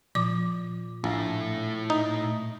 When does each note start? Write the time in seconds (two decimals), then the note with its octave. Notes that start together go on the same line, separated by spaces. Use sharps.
0.15 A#2 F3 D6
1.04 A#1 A2 E4
1.90 D#4